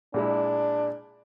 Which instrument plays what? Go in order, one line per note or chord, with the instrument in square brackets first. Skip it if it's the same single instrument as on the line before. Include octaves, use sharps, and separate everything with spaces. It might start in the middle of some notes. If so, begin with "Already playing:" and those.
[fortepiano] A#2 G#3 E4 [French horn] D4